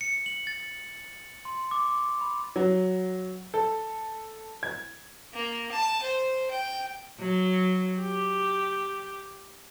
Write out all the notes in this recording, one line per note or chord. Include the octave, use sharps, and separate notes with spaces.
C#7
F#7
A6
C6
D6
B5
F#3
A4
G#6
A#3
A5
C5
G5
F#3
G4